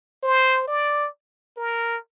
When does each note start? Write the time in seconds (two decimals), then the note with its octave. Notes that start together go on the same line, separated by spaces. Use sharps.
0.23 C5
0.67 D5
1.57 A#4